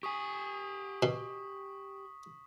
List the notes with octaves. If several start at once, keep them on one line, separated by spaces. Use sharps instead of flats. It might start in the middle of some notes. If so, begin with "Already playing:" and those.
G4 G#5 C#6 D#6 B6
B2